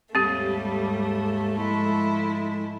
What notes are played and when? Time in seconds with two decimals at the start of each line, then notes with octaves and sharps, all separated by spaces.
0.15 D#2 G#2 G3 A3 C4 G4
1.58 F3 G#3 E4